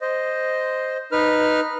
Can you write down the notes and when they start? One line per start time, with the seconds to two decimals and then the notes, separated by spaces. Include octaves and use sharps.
0.01 C5 D#5
1.12 D#4 B4 F6